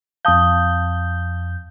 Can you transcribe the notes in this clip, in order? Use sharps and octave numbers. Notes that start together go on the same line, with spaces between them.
F2 F5 A5 D#6 G6